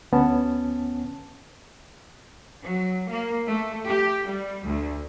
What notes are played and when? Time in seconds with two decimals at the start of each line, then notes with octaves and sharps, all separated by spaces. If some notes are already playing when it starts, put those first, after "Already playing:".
0.12 D2 B3 C#4 A5
2.64 F#3
3.10 A#3
3.48 A3
3.87 G4
4.27 G3
4.66 D2